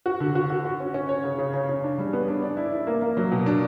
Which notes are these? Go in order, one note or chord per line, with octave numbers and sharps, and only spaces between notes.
F#4
D3
F#4
F#4
F#4
C#4
C#4
C#5
C#3
C#3
C#3
C#3
D4
G3
B3
D4
D5
E4
E4
A#3
A#3
F#3
B2
D4